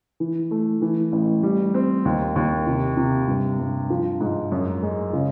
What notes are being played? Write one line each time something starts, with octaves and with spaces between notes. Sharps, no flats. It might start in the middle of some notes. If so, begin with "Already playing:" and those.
E3
A3
E3
A1
G3
C4
D#2
D#2
C3
C3
G2
G2
F3
G#2
F#2
G#3
C#3